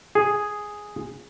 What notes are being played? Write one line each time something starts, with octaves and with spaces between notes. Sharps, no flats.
G#4